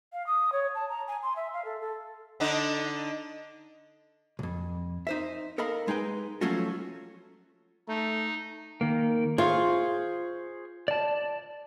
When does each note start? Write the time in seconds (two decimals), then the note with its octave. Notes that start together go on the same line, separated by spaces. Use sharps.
0.13 F5
0.27 D#6
0.53 C#5
0.75 A5
0.89 A#5
1.08 G#5
1.23 C6
1.36 E5
1.53 F5
1.65 A4
1.81 A4
2.40 D3 D4 D#4
4.39 B1 F2
5.07 D#4 C5 E5
5.58 A4 A#4 D#5 F5 B5
5.88 G#3 D#4 B4 G5
6.41 F3 F#3 A3 C#4 F4 F#4
7.88 A3 D#4
8.81 D#3 A#3
9.38 F4 G#4 C5 C#6
10.88 D5 A5